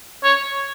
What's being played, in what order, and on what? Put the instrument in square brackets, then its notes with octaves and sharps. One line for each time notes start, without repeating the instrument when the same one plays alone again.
[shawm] C#5